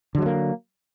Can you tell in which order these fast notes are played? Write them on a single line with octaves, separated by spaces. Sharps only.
D3 F#3 G#3 A#3